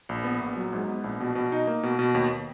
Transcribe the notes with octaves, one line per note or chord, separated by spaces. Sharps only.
A#1
B3
A#1
F#3
G#2
B3
A#1
B2
B2
D#4
A#3
B2
B2
D#2